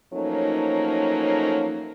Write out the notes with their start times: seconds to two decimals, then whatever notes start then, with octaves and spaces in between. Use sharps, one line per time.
0.13 F3 F#3 A3 A#3 C#4 D#4